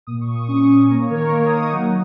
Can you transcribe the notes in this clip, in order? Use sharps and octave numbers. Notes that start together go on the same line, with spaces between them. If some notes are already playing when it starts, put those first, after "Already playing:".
A#2 D#6
C#6
A#2
D#6
C#4 C#6
C#4 C#6
A#3 A#5
C#5
D#3 A#4
C#5
A#3 C#5
D#6
D#4
C#6
F#3 F#5